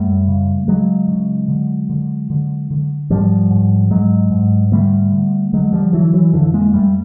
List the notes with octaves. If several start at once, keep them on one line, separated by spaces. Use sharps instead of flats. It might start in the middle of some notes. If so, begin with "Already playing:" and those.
Already playing: F#2 G3 A3
C#3
C#3 F#3 G#3
C#3
D3
D3
D3
D3
G#2 F3 G3
G#2
G#2 F#3 G#3
G#2
D3 G3 A3
D3
D3 F#3 G#3
F3 G3
D3 E3 F#3
E3 F#3
F2 D3 E3
G#3 A#3
F2 G3 A3